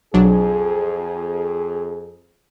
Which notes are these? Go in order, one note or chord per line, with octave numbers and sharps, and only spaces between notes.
B1 F2 F#3 D4 G#4